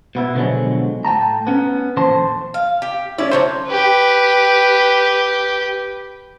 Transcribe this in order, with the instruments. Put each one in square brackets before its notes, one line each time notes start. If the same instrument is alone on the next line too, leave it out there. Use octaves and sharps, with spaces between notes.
[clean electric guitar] B2 B3 E4
B2 D3 F3 F#3 G#3
A2 G5 A5 A#5
B3 C#4
F2 A#2 E3 C5 A5 C6
[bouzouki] F5
G4
[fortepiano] C#4 E4 [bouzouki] D5
[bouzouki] D3 F#3 D4 [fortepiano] C5 C#5
[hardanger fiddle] G4 B4